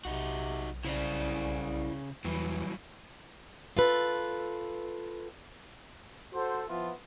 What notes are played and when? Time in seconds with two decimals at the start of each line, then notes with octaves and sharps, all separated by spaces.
0.05 B1 C3 D#4 F#4
0.85 C2 C#3 E4 C5 D5
2.25 E2 E3 F#3 G3 E4
3.77 F4 A4 B4
6.34 F#4 A4 C5
6.69 F3 B3 E4 F4